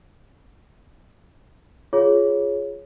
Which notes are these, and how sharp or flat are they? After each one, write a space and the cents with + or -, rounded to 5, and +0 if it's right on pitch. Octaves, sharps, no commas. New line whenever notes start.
F4 +0 G#4 +0 C#5 +0